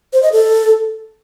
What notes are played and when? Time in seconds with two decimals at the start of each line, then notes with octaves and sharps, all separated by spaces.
0.13 C5
0.23 D#5
0.32 A4